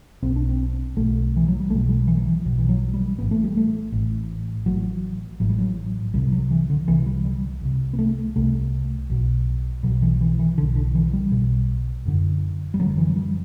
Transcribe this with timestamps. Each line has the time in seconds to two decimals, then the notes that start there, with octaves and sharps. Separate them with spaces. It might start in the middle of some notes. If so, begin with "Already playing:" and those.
0.22 B1 B2 C4
0.36 D4
0.49 C4
0.96 B1 B2 A3
1.36 E3
1.48 F#3
1.60 G3
1.70 B1 A3
1.75 B2
1.89 G3
2.07 E3
2.17 F#3
2.26 E3
2.44 B1 B2
2.58 E3
2.69 F#3
2.94 G3
3.18 A1 A2 B3
3.31 A3
3.44 G3
3.57 A3
3.92 A1 A2
4.66 A1 A2 F#3
5.40 A1 A2 F#3
5.49 G3
5.58 F#3
6.14 C2 C3 G3
6.32 F#3
6.51 E3
6.70 D3
6.88 C2 C3 E3
7.06 G3
7.25 G3
7.62 C2 C3
7.93 B3
7.99 A3
8.36 C2 C3 A3
9.10 B1 B2
9.83 B2 F#3
9.88 B1
10.02 E3
10.21 E3
10.39 E3
10.57 B2 D3
10.61 B1
10.76 D3
10.95 E3
11.13 G3
11.31 B1 B2
12.05 F#1 F#2 D3
12.74 G3
12.79 F#1 F#2 D3 F#3
12.98 E3
13.10 F#3
13.16 G3